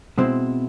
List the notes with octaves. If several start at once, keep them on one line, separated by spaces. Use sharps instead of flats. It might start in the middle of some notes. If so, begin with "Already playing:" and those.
B2 G#3 C4 E4